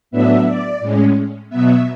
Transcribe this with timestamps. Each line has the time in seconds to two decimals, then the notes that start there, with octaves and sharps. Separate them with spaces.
0.11 A2 F#3 B3 D4 E5
0.46 D5
0.80 A2 G#3 C#4
1.50 B2 F#3 B3 E5